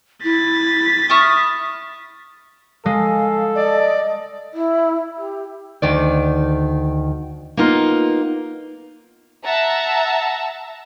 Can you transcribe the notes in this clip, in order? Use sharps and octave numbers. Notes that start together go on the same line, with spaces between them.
E4 A6 B6
E4 C#6 D#6 F6
G#3 A4 F5
D5 D#5
E4
G4
D2 D#3 D5
A#3 B3 D#4 F4
E5 F#5 A5 A#5